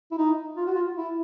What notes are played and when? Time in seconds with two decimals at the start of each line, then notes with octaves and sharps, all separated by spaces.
0.11 E4
0.18 D#4
0.57 F4
0.66 F#4
0.74 F4
0.97 E4